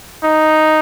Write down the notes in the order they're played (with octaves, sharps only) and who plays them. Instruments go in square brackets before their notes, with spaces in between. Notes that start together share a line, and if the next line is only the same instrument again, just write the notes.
[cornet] D#4